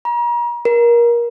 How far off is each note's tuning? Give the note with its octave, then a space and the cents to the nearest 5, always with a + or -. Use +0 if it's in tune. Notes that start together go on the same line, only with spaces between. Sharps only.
A#5 +40
A#4 +25